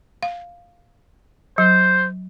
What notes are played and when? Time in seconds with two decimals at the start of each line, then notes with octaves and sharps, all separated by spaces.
0.23 F5
1.58 F#3 C5